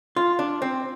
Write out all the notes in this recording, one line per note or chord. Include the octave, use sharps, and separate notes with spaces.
F4
D4
C4